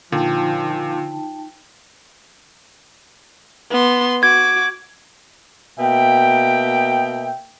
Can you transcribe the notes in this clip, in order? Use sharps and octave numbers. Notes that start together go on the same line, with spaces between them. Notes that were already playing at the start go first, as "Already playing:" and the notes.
A#2 D3 F3 D#4 G5 A5
B3 C6
F#4 D6 G#6
B2 A#3 E5 G5